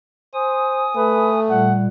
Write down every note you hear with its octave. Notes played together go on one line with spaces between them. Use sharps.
C5 G#5 D#6
A3 B4
A#2 G3 F#5